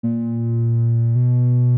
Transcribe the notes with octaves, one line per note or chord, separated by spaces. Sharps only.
A#2
B2